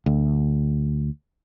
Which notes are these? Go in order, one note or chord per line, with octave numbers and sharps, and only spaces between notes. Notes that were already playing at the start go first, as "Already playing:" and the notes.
D2